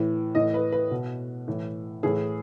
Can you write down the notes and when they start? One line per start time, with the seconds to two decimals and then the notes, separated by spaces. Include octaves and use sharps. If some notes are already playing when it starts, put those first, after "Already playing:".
Already playing: A2 E3
0.35 A2 E3 D#5
0.54 B4
0.72 B4
0.91 B2
1.48 A2 E3
2.03 A2 E3 G#4